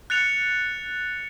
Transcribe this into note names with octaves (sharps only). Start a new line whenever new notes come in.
F#6 A6 C#7 F7